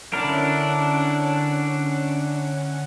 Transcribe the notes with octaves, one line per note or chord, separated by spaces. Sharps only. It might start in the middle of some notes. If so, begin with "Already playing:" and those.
D3 C#4 D4 E4 A#4 F#5